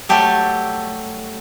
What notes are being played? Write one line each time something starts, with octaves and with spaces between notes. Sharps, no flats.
F#3 G3 A3 G4 A4